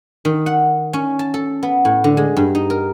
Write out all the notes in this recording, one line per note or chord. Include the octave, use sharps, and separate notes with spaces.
D#3
F#5
C#4
A5
A4
B3
A2
D3
G#3
G2
D#4
A#4